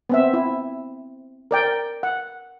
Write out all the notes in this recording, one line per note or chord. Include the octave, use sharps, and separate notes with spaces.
B3 C4 E5
E4
A#4 D5 G5
F#5